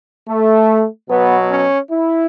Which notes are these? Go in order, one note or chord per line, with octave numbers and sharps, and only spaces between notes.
A3
B2 F#3 B3
C#4
E4